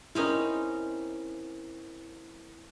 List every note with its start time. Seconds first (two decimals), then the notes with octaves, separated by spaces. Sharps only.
0.15 C4 C#4 D#4 E4 A#4